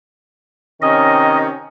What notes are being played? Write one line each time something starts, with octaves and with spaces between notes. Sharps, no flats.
C3 D#3 C#4 D#5